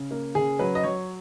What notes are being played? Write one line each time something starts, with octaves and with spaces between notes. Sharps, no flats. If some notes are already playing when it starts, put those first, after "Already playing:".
Already playing: C#3
A#3
C#3 G#4
F#3 B4
D#5
F#3 C#5